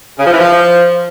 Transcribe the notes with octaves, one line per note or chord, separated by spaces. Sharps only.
C#3
F3
E3
F3